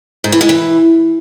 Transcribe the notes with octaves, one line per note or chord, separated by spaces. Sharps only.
G#2
E3
G#3
E3